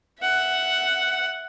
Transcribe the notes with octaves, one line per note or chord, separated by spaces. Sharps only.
E5 F#5